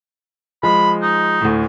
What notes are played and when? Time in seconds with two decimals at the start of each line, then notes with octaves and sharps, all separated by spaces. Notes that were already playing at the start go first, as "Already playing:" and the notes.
0.63 F3 G#3 B5
1.02 D#4
1.41 D2 A2